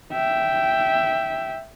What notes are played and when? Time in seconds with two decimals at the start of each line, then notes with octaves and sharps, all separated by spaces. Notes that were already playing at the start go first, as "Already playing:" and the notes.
0.13 E5 G5